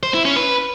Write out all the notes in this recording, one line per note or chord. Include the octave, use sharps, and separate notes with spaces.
C5
E4
C#4
B4